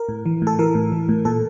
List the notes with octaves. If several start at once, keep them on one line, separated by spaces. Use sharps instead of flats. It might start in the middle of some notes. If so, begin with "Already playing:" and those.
Already playing: A#4
A2
E3
A2 A4
E3 A#4
A2
E3
A2
A#2 A4